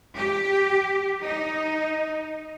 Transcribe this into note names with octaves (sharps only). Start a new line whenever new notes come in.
G4
D#4